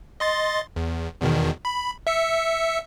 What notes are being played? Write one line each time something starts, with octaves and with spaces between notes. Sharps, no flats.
D#5 C6 A6
E2
E2 B2 D#3
B5
E5 E6 C#7